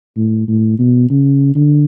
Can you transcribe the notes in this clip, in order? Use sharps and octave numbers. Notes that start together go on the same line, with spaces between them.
A2
A2
B2
C#3
D3